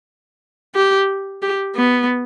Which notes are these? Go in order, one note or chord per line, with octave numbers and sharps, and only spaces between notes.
G4
G4
B3